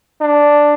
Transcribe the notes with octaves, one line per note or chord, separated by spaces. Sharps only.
D4